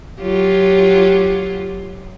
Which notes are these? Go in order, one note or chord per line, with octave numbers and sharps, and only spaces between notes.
F#3 F4 G4